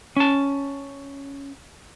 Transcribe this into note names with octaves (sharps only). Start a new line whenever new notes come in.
C#4 A5